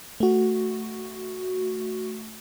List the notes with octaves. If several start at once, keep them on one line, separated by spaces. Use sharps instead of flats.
A3 F#4